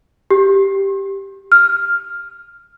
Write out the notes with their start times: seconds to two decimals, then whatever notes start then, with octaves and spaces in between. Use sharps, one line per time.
0.30 G4
1.52 F6